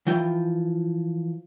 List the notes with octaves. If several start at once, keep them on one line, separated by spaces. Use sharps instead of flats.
E3 F3 G5